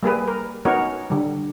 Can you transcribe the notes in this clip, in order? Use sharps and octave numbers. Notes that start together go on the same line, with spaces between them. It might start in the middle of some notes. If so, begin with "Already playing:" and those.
G3 A#3 G#4 B4
A#4
B3 C#4 D#4 F#4 A#4 C#5
D3 G3